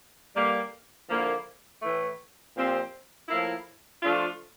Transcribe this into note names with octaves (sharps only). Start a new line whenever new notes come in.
G2 D3 G3 A#3
D3 F3 A#3 E4
A2 E3 A3
A#2 F3 C4 G4
A2 F3 A#3 E4
F3 A3 D4 F4